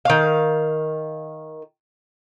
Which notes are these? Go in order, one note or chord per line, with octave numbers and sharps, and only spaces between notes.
D#3 F5